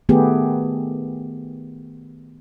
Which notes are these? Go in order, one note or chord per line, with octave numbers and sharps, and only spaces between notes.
D#3 A3 B3 G4 G#4